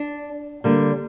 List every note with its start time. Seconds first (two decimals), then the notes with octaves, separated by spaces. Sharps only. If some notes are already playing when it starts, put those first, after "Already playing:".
Already playing: D4
0.64 D3 G3 A#3